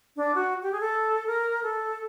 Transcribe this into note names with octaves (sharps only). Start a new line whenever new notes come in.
D4
F#4
G4
G#4
A4
A#4
A4